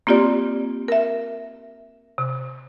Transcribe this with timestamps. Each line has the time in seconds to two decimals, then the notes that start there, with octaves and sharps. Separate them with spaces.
0.07 A#3 C4 F4 G4 D5
0.88 A#4 E5
2.18 C3